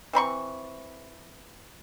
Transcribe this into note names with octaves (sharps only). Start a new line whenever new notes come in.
E3 C4 B5 C#6